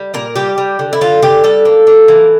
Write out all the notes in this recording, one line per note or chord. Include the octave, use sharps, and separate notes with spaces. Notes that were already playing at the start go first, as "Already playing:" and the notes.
Already playing: G3
A#2 A#4
G3 G4
G3
D3
E4
D3 F4
D3 G4
G3 A4
A#3
A#3
E3